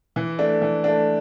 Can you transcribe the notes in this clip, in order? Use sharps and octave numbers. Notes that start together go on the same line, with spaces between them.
E3
A3 D4
E3
A3 D4